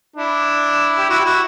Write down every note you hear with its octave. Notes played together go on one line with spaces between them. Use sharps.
D4 E4
G4
E4 F#4
G4
E4 F#4